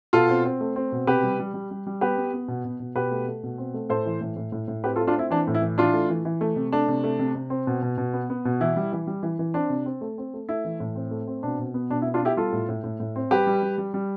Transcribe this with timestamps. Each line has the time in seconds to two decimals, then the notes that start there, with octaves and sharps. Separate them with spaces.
0.13 B2 F4 A4
0.29 C4
0.45 C4
0.61 A3
0.76 C4
0.92 B2
1.07 C3 G4 B4
1.23 G3
1.39 G3
1.54 G3
1.71 G3
1.87 G3
2.01 B3 G4 B4
2.17 B3
2.33 B3
2.48 B2
2.65 B2
2.80 B2
2.95 B2 G4 B4
3.11 A3
3.28 A3
3.43 B2
3.58 C4
3.74 A3
3.90 A2 A4 C5
4.06 E3
4.21 A2
4.36 A2
4.52 A2
4.68 A2
4.84 C4 G4 B4
4.96 F4 A4
5.00 A3
5.07 D4 F4
5.16 C4 E4
5.31 E3 D4
5.47 A2
5.55 E4
5.62 E3
5.78 E3 D4 F4
5.93 A3
6.10 E3
6.25 E3
6.41 A3
6.56 C3
6.72 A3 D4
6.88 C3
7.04 A3
7.19 C3
7.35 C3
7.50 C4
7.67 B2
7.82 B2
7.98 B2
8.13 B3
8.30 B3
8.45 B2
8.61 E3 E4
8.76 G3
8.92 E3
9.07 G3
9.23 E3
9.39 E3
9.54 C4 D4
9.70 C3
9.86 C4
10.01 A3
10.18 C4
10.34 A3
10.49 A3 E4
10.65 E3
10.80 A2
10.95 C4
11.11 A3
11.27 C4
11.43 B2 D4
11.59 B2
11.74 B3
11.90 B2 D4
12.02 E4
12.06 B3
12.14 D4 F4
12.22 B3 E4 G4
12.37 G3 F4 A4
12.53 A2
12.69 A2
12.84 A2
13.00 A2
13.16 C4
13.31 G3 G4 B4
13.47 G3
13.62 G3
13.78 G3
13.94 G3